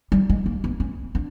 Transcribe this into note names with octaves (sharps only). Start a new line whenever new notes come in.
G3
G#3
A#3
B3
C#4
D4